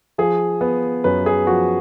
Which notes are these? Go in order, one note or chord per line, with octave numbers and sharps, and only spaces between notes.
F3 G#4
B3
F#2 B4
G#4
F3 F#4